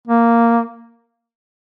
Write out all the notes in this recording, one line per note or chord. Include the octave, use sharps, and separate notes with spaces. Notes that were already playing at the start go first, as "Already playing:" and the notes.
A#3